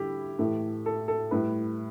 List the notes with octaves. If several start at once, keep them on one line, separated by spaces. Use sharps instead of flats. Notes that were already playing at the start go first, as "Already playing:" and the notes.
Already playing: D3 G3 E4 G4
A2 E3 A3
A4
A4
A2 G3 B4